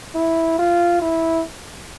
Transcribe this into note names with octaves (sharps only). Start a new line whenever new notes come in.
E4
F4
E4